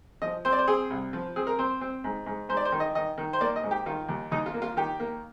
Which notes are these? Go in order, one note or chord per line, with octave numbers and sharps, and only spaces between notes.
F3 D#5
C4 C5
D5
C5
C4 G#4
C2
F3
C4 G#4
A#4
C4 C5
C4
G#2
G#2
G#2 C5
D5
C5
D#3
D#5
D#3 D#5
D#3
C5
A#3 D5
D#5
G#2
G4
D#3 F4
D#2
D#2 D#4
F4
A#3
F4
D#3 G4
A#3